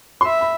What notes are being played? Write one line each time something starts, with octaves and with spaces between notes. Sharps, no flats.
C6
E5 B5
B5